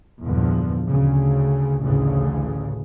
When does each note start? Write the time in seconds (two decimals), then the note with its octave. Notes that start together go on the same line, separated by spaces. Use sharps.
0.24 A#1 E2 G2 D3 F3
0.90 D2 C#3
1.82 A1 D2 C#3